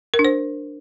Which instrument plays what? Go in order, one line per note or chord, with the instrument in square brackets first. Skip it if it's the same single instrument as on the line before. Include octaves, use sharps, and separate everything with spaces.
[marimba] A#4
D4
C5